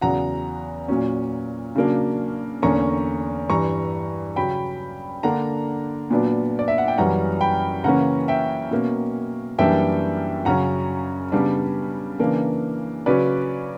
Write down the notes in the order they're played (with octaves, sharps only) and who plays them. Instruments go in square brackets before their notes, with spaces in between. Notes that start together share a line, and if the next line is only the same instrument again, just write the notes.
[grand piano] E2 C#3 F#3 F#5 A#5
A#2 F#3 C#4
C#3 F#3 A#3 D4
E2 D3 A#3 C#4 A#5 C#6
G2 E3 G3 A#5 C#6
C#3 F#3 C#4 G5 B5
D3 A#3 D4 F#5 A#5
A#2 F#3 B3 D4
D5
E5
F#5
G5
F#2 E3 G3 C#4 F#5 A#5
G5 B5
C#3 E3 A#3 C#4 F#5 A#5
E5 G5
B2 A#3 C#4
F#2 E3 G3 A#3 D4 E5 G5
F#2 C#3 F#3 C#4 F#5 A#5
C#3 G3 B3 D4
C#3 E3 A#3 D4
C#3 F#3 C#4 B4 D5